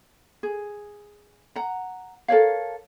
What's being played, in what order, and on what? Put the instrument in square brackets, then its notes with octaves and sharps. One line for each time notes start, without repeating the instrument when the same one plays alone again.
[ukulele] G#4
F#5 A#5
A4 A#4 C#5 F5